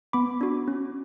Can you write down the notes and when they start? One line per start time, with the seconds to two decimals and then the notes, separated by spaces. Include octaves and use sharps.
0.13 B3 B5 D6
0.41 D4 F#4
0.68 C#4